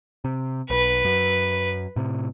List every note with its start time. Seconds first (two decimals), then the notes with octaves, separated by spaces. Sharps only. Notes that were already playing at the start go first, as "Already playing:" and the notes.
0.25 C3
0.70 B1 B4
1.05 F#2
1.96 A2 C3